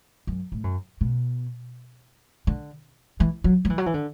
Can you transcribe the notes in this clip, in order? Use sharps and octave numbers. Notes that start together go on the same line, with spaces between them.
F#2
A2
F#2
B2
D3
E3
F#3
F#3
E3
F#3
E3
D3